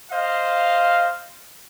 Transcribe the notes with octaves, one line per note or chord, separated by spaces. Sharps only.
C5 D#5 F5